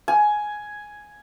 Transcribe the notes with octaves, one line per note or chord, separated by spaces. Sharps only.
G#5